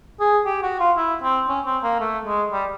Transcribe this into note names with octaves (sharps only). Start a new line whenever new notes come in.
G#4
G4
F#4
F4
E4
C4
C#4
C4
A#3
A3
G#3
G3